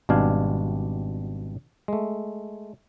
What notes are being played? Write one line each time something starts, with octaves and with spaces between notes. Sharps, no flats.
G#1 B2 G3 D4 F5 G#5
G#3 A3